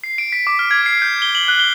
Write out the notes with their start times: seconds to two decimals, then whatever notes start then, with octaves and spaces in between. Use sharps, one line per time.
0.04 C7
0.18 D7
0.32 B6
0.47 D6
0.59 F6
0.71 G#6
0.86 C7
1.02 G6
1.22 G7
1.35 F#7
1.48 F#6
1.60 G7